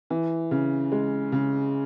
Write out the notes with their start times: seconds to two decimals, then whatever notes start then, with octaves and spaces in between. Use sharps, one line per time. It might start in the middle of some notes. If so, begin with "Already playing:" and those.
0.10 E3
0.51 C#3
0.92 G#3
1.32 C#3